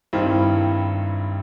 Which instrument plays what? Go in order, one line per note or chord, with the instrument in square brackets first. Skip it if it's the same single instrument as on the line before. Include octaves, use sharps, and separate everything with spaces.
[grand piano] G2 D#3 G3 C4 E4